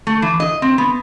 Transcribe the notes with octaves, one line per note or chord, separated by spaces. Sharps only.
A3
E3
D#5
C4
B3